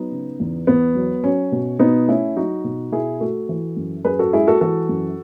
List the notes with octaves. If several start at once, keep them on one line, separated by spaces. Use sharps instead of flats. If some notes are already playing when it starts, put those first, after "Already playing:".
Already playing: F#3 B3 D#4
C#3
E2
E2 B3
F#3
F#3 C#4
B2
B2 B3 D#4
A3 C#4 E4
F#3 D#4 F#4
B2
B2 E4 G#4
A3 F#4 A4
E3
F#2
F#2 G#4 B4
F#4 A4
G#3 E4 G#4
F#4 A4
E3 F#4 A4
F#2